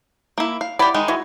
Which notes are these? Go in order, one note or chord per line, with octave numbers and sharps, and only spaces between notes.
A#3 E4
F5
E4 G4 D5 F#5 B5
D#3 G#3 D#4
E4 F#4